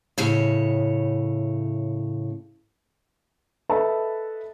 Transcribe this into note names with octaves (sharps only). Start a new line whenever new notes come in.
A2 C#3 C#5
A4 B4 D#5 E5 A5